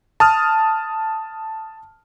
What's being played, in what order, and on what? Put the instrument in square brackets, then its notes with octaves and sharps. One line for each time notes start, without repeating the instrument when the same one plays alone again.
[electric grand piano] A5 D#6 F6